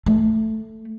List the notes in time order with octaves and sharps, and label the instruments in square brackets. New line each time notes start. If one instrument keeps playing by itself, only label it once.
[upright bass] A3